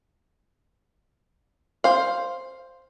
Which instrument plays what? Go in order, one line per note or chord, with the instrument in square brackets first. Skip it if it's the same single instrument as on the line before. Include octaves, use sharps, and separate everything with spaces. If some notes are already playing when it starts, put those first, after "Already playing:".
[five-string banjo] C5 F5